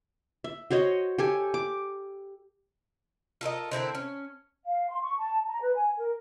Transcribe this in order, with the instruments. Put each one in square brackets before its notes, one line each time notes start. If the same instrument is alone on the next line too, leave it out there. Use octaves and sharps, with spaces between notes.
[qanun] E5
F#4 C5 C#5 D#5
G4 A4 G#5
D6
[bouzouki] F4 A4 A#4 D#5
D3 C4 E4 A#4
C#4
[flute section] F5
C6
C#6
A5
A#5
B4
G#5
A#4